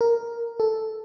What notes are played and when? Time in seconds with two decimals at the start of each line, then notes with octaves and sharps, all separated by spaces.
0.01 A#4
0.60 A4